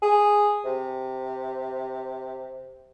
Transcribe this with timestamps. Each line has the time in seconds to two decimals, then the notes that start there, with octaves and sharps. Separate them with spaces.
0.02 G#4
0.65 C3